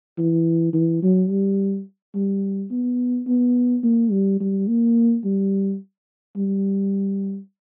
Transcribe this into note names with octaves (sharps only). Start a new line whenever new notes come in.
E3
E3
F#3
G3
G3
B3
B3
A#3
G3
G3
A#3
G3
G3